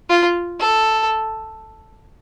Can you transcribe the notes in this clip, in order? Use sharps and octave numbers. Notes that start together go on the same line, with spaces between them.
F4
A4